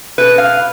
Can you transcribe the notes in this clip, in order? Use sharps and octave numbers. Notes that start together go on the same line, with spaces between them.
B2 B4
F5